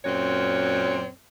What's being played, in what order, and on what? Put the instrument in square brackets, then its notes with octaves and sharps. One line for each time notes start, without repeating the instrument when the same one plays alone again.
[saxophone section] F#2 A#2 C4 C#5 D5